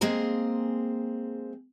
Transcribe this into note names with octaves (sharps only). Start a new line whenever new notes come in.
G#3 A#3 C4 G#4 A#5